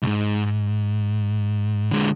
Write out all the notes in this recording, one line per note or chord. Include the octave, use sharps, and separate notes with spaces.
C2 G#2
D3 G#3